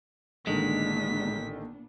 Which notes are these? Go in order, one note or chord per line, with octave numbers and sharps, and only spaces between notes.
A1 A#2 D3 D#3 G#3 B3 D4 B6